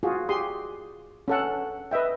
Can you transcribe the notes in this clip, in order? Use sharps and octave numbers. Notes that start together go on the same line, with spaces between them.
F4 F#4 G#4
G4 G#4 C6 D#6
C#4 A4 F#5
B4 D#5 E5 G5